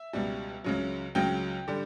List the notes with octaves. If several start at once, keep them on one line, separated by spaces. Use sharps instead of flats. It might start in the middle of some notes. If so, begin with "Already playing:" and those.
Already playing: E5
C#2 B2 G3
C#2 C#3 F#3
C#2 C#3 F#3 G5
D3 G3